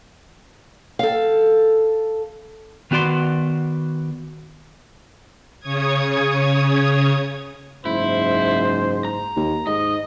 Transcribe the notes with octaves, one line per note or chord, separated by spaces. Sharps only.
A4 F5
D#3 B3 F#4 D5 C6
C#3 C#5 D#6 G#6
F#1 G#2 E4 C5
A#5
D#2
G#2 D#5 D#6